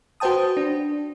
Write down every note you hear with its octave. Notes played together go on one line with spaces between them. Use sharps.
F#4 B4 C5 G5 A5 D#6
D4